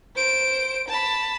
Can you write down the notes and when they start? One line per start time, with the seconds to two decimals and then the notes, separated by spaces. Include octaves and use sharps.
0.16 C5 D7
0.88 A5 B5